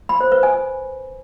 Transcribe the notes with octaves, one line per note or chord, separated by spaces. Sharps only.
B5
C5
B4
G#5